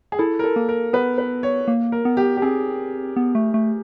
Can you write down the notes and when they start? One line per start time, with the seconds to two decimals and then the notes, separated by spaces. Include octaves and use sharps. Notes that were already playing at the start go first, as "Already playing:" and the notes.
0.12 G#4
0.19 E4 A4
0.39 A#4
0.44 A4
0.56 A#3
0.69 A#4
0.93 B3 B4
1.18 B4
1.43 C#5
1.68 A#3
1.92 A#4
2.05 B3
2.17 G4
2.37 G4
2.42 C4 G#4
3.16 B3
3.35 A3
3.54 A3